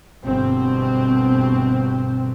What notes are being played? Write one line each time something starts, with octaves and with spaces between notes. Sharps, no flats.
G1 B2 C4